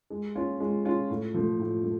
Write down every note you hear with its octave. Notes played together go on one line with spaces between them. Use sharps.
G#3
C#4 F4
G#3
C#4 F4
A2
F3 A3
A2
A3